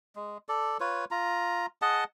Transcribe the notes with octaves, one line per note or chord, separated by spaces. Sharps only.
G#3
A4 D5
F4 B4 C#5
F4 A#5
G#4 D#5 F#5 A5